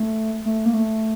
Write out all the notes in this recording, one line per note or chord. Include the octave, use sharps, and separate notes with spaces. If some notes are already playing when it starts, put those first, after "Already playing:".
Already playing: A3
A3
A#3
A3